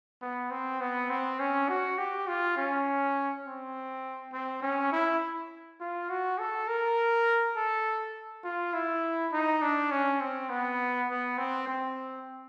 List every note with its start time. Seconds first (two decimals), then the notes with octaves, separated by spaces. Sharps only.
0.22 B3
0.51 C4
0.81 B3
1.10 C4
1.39 C#4
1.69 F#4
1.98 G4
2.27 F4
2.57 C#4
3.45 C4
4.33 C4
4.62 C#4
4.92 E4
5.80 F4
6.10 F#4
6.39 A4
6.68 A#4
7.56 A4
8.44 F4
8.74 E4
9.32 D#4
9.62 D4
9.91 C#4
10.21 C4
10.50 B3
11.09 B3
11.38 C4
11.68 C4